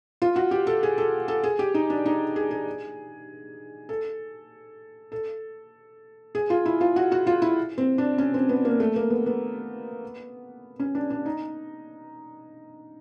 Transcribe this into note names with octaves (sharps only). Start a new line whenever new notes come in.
F4
F#4
G4
A4
G#4
A4
A4
G#4
G4
D#4
D4
D#4
G#4
G#4
A4
A4
G#4
F4
E4
F4
F#4
F#4
F4
E4
C4
D4
C#4
C4
B3
A#3
A3
A#3
B3
B3
C#4
D4
D4
D#4